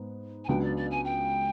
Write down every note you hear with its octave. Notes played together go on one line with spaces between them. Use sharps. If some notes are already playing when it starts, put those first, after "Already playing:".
Already playing: G#2 B3
G#5
C#2 C#3 F#3 B3 D4 G5
D5
D5
G#5
G5